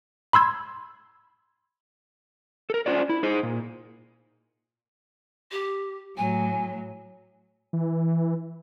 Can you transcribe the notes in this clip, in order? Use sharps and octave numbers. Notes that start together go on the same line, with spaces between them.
B5 C6 E6 G#6
A4 A#4
C#4 D4 F4 C5 D5
E4
D#4 G#4 C5
A#2
G4
A2 F#3 G#5
E3